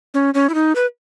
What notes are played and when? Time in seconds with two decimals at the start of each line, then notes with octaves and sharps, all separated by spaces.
0.14 C#4
0.34 C#4
0.49 E4
0.54 D#4
0.76 B4